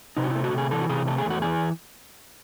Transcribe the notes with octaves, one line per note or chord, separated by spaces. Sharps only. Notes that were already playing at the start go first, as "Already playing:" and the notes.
C3 D#4
F#4
E4
A3
F#4
C3 G#4
E3 A4
F#4
C3 G#4
A3 A4
G#4
E2
F#4
E3 G#4